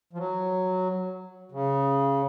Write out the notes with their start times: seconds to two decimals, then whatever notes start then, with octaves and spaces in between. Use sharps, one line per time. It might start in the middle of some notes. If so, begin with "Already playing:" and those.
0.13 F3
0.18 F#3
1.52 C#3